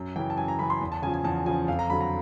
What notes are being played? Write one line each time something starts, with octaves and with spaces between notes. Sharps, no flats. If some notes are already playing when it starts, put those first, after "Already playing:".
Already playing: F#2
C#3 E3 G5
A5
F#2 G#5
A#5
C#3 E3 B5
C6
E2
A5
C#3 F3 G#5
G#5
E2 A5
C#3 F3 G#5
F2 F5
A#5
D3 F#3 B5
A#5